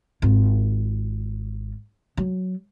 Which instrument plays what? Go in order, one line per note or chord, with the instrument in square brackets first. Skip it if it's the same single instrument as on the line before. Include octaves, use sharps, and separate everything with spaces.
[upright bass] G#1 F4
F#3